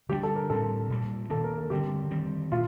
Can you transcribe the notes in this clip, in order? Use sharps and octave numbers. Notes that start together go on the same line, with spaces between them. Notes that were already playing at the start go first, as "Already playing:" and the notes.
D3 G3 A#3 D4 G4
A4
A#4
A2 G3 C4 A4
A#2 G3 A#3
D#3 A#3 D4 A4
A#4
A4
D3 G3 C4 G4
D#3 G3 C4
A#2 A3 F4